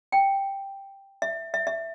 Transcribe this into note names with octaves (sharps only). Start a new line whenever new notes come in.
G5
E5
E5
E5